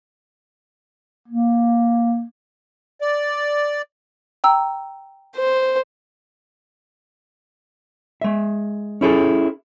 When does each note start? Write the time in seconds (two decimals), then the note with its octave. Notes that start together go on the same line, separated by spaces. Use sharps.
1.28 A#3
3.01 D5
4.44 G5 A#5 E6
5.36 C5
8.21 G#3 E5
9.01 C#4 E4 G#4 A4